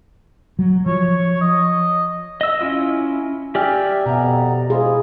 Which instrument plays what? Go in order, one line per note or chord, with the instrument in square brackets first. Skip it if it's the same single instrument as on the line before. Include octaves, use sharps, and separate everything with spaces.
[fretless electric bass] F#3
[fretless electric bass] F3 [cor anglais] C#5
[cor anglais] D#5
[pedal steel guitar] D#5 E6
C#4 E4 F4
[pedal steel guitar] G4 D5 F6 [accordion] E5 G5 G#5
[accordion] F2 B3 A#5 [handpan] B2
[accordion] G#3 E4 F4 [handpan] G#4 C5